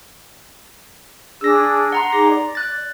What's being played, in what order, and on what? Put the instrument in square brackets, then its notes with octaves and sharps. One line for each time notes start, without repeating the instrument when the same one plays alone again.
[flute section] D4 G#4 [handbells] E6 A#6
[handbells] F#5 A#5 C6
[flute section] D#4 G#4 D6 [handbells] A#6
[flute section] D5
[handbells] F#6 A6